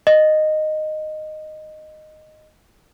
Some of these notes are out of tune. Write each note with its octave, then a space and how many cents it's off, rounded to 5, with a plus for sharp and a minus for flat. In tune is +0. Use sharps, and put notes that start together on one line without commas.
D#5 -10